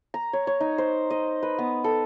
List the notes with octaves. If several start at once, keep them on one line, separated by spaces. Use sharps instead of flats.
A#5
C#5
C#5
D#4
C5
D#5
B4
B3
A4